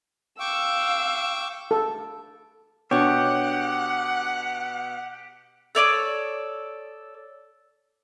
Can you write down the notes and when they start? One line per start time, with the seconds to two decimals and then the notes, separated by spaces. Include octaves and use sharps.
0.40 F5 G5 C#6 D6 E6
1.71 A4
2.91 B2 D4 G4 C#5 F#5
5.75 A4 C#5 D5 D#6